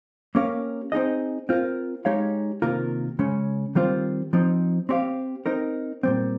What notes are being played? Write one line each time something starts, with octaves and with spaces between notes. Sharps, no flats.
A#3 C#4 G4 A#4 F5
C4 D#4 G#4 D#5
C4 F4 A#4
G#3 D#4 G4 C#5 F5
C3 D#3 A#3 F4 A#4
C#3 G#3 C#4
D#3 G3 C4 F4 C5
F3 C4 D#4
C4 G4 C#5 F5
C4 D#4 A#4
A#2 G3 C4